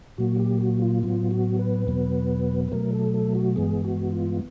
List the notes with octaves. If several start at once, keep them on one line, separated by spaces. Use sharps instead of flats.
A#2 F#3 A#3 F#4
G4
F#4
F4
A2 F#3 B3 F4
F#4
B4
E2 B2 F#3 B3
B4
B2 F#3 A3 A#4
A4
A4
F#4
G2 E3 G#3 B3 G#4
F#4
F4